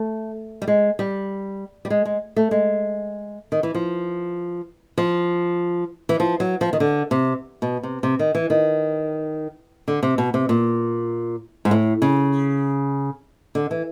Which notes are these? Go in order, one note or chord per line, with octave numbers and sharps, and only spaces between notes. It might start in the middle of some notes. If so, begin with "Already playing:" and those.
Already playing: A3
G3
G#3
G3
G3
G#3
G#3
A3
G#3
D#3
E3
F3
F3
E3
F3
F#3
F3
D#3
D3
C3
B2
C3
C3
D#3
E3
D#3
D3
C3
B2
C3
A#2
G#2
A2
C#3
D3
E3